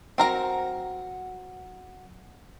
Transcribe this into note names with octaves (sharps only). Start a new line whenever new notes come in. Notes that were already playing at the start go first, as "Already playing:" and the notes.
F#3 C4 A#4 F#5 A#5